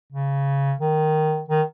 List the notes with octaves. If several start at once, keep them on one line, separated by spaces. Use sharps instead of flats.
C#3
D#3
D#3